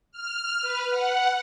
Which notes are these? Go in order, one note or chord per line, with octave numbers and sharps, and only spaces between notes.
F6
B4
F#5